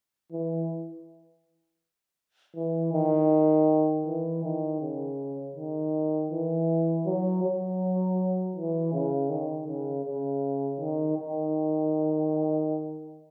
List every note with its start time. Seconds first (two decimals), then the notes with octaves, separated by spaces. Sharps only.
0.32 E3
2.56 E3
2.94 D#3
4.06 E3
4.44 D#3
4.81 C#3
5.56 D#3
6.31 E3
7.06 F#3
7.43 F#3
8.56 E3
8.93 C#3
9.30 D#3
9.67 C#3
10.05 C#3
10.80 D#3
11.17 D#3